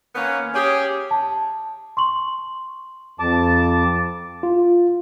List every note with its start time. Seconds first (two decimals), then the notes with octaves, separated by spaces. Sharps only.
0.15 D#3 A#3 B3 C#4
0.54 C#4 G4 G#4
1.11 A5
1.97 C6 C#6 F#7
3.20 F2 A5 D6
4.43 F4